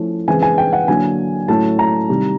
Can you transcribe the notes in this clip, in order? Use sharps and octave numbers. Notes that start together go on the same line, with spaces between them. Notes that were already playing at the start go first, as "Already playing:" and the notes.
Already playing: F3 A3 C#4 E4
C#3 E3 G#3 C4 G#5
G#5
G5
F#5
D3 F#3 A#3 G#5
A2 F#3 A3 C#4 E4 A5
A#5
C3 D#3 G3